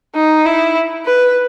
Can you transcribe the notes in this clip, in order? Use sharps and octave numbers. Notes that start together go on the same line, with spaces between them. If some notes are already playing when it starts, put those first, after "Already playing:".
D#4
E4
B4